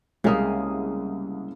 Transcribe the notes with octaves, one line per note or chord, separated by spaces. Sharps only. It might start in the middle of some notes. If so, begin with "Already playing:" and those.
C2 C#3 G#3 A#3 D#6